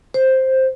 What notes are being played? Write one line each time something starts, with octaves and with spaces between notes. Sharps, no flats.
C5